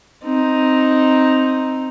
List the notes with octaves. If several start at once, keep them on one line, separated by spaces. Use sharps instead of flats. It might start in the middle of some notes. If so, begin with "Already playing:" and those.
C4 D#4